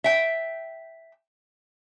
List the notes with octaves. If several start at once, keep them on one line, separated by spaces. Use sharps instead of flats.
E5 G5